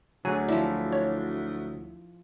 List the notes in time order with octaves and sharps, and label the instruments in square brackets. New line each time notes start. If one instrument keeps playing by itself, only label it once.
[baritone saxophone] D2 [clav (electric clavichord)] F#3 [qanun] G#4 [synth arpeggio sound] G#5
[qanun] F3 E4 [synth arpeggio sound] D5
[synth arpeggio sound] C#5